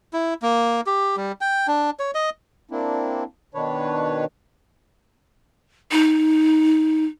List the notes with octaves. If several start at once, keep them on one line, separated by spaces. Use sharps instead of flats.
E4
A#3
G4
G3
G5
D4
C#5
D#5
A#3 C4 D4 E4
B2 D#3 D4 B4 C#5
D#4